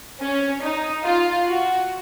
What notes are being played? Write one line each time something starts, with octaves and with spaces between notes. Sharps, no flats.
C#4
D#4
F4
F#4